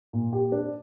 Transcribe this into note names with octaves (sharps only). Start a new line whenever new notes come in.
A#2
G4
D4